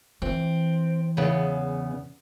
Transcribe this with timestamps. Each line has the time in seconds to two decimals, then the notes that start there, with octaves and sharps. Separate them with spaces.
0.22 E3 C4
1.17 E2 C#3 B3